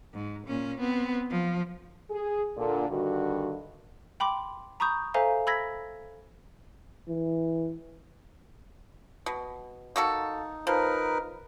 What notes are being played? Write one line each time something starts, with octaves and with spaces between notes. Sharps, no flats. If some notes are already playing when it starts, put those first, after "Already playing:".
G#2
A#2 C#4
B3 C4
F3
G#4
A#2 D3
G2 D3 D#3 F#4
G5 B5 C6 D6
A#5 B5 C#6 D#6 G6
A4 C5 E5 F5 G#5 A#5
B5 E6 G#6 A#6 B6
E3
B2
A#3 D#4 F#4 A4
F3 D#4 A#4 B4